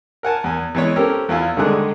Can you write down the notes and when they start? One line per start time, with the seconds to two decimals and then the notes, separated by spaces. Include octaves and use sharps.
0.23 A#4 F#5 G#5 A5
0.44 E2 G#5
0.75 E3 G#3 B3 E4 C#5
0.96 C4 C#4 G4 A4 A#4
1.29 E2 E4 F4 G#5
1.57 C2 D3 D#3 G#3 G#4 F#6